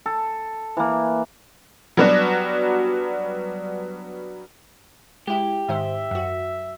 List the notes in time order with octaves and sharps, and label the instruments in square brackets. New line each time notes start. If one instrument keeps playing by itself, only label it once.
[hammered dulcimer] A4
E3 A#3
[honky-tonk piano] F#3 G3 B3 D4 F#4
[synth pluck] G#3 E4 [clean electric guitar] G4
[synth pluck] G#2 D#3 C5 [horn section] E5
[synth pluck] F#2 F#4